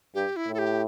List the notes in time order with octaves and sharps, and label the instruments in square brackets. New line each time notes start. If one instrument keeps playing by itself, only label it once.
[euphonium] G2 [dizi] G4
[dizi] E4
[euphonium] A2
[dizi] A4
G4